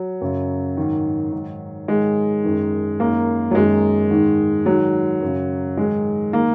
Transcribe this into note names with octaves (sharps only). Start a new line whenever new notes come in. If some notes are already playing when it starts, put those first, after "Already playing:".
Already playing: F#3
F#2 C#3
G#2 D#3
G#2 D#3
G#2 D#3 G#3
F#2 D#3
F#2 D#3 A#3
F#3
F#2 D#3 G#3
G#2 D#3
G#2 D#3 F#3
F#2 C#3
G#2 D#3 G#3
D#3 A#3